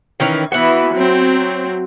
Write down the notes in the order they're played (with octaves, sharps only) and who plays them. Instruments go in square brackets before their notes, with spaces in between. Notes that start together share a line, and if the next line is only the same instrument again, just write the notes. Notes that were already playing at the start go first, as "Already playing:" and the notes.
[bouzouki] D#3 E3 C#4
[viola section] E3 B3 E4 [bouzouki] F#4 E5 F#5
[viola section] F#3 C4